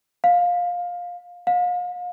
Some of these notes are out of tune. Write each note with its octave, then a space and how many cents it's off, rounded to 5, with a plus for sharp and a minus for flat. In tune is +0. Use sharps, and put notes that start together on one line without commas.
F5 +15
F5 +40